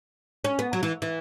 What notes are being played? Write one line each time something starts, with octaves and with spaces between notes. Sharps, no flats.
C#4
B3
F#3
E3
E3